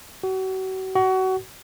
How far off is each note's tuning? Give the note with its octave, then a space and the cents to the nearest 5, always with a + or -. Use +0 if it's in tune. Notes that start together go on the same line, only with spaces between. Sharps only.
F#4 +35
F#4 +25